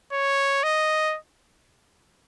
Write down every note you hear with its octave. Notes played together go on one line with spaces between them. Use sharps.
C#5
D#5